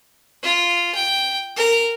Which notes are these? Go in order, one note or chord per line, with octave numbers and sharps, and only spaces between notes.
F4
G5
A#4